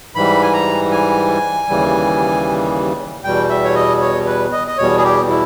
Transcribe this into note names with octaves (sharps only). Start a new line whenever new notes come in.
G#2 E3 G3 B5
G#5
A#5
G#5
D#2 C#3 E3 G3
E2 B2 G3 G5
E5
C#5
D#5
C#5
B4
D#5
D#5
E2 B2 G3 C#5
G#4
G4
E4